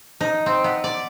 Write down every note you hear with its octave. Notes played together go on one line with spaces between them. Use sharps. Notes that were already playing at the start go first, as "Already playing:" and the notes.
D#4
C4
B3
D5